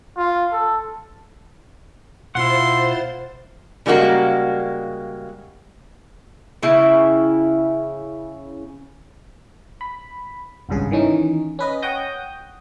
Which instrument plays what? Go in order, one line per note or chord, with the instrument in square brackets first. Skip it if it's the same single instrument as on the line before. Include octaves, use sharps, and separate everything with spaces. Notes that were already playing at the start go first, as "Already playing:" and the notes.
[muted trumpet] F4
A4
[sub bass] B2 [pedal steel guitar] E4 F4 F#5 [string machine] C5 A6 [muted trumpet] C6
[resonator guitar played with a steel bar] C#3 G3 G#3 A#3 F#4
[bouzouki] C#3 C#4 E4 G5
[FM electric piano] B5
G#1 C#2 G2 C#3 G#4
D#3 E3 C#4 D#4
C#4 B4 D#5
C#5 F#5 G5 D#6 G6 A#6